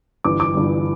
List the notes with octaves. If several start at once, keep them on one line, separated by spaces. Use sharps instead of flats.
G1 G2 E3 D6
D6
G1 G2 E3